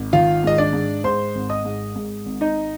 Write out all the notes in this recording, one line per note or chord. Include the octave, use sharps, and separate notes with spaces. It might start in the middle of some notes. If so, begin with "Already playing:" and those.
Already playing: G#1
D#3 F4 F5
G#2 D#5
D4 D5
G#2
G#2 C5 C6
G#1
D#5 D#6
G#2
G#2
G#1
D#4 D#5